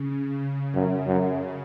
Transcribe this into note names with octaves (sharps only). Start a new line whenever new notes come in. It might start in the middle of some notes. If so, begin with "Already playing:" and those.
Already playing: C#3
F#2
F#2